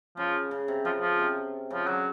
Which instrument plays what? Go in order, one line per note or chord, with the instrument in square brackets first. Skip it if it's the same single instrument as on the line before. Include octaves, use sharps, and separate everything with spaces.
[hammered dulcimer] C#3 [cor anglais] F3
[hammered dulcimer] C#3
C3
[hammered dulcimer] C#3 [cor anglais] F3
[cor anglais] F3
[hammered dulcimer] C3
[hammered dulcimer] C#3 [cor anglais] F3
[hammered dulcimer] D3 [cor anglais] F#3